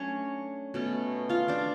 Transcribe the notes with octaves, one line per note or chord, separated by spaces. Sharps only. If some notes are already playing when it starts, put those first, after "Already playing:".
Already playing: F#3 A3 C#4 D4 C#5
B2 A3 C#4
F4 F5
D4 D5